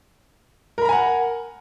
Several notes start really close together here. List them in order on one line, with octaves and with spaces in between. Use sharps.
A#4 B5 A#5 G#5 F#5